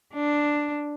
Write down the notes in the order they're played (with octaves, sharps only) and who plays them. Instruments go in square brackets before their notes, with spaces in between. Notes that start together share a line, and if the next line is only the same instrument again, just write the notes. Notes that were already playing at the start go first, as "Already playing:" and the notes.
[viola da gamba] D4